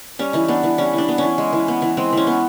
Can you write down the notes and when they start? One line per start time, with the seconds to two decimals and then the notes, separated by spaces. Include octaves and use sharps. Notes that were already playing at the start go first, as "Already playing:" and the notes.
0.19 G3 C#4
0.33 E3 D#4
0.48 B3 D4
0.63 E3
0.78 G3 C#4
0.93 E3 D4
1.08 B3
1.18 E3 C#4
1.38 G#3
1.53 E3
1.68 B3
1.82 E3
1.97 G#3 C4
2.13 E3 C#4
2.27 B3